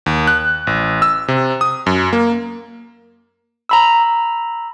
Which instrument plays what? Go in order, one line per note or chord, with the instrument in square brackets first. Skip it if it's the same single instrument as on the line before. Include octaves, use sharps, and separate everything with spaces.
[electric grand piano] D#2
F#6
A1
E6
C3
D#6
F#2
A#3
[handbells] A#5 B5 E6